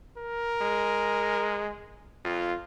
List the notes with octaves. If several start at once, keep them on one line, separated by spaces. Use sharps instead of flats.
A#4
G#3
F2 F4